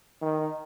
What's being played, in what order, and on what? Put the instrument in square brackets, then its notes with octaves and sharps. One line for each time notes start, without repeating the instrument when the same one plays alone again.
[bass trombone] D#3